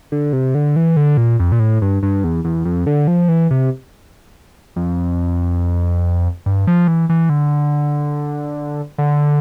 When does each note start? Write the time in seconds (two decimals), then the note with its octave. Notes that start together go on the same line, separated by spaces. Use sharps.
0.12 D3
0.33 C3
0.55 D3
0.76 E3
0.97 D3
1.17 A#2
1.40 F2
1.52 A#2
1.60 A2
1.82 G2
2.03 G2
2.24 E2
2.44 E2
2.65 F2
2.86 D3
3.07 F3
3.28 E3
3.51 C3
4.76 F2
6.46 G2
6.67 F3
6.88 E3
7.09 E3
7.29 D3
8.98 D3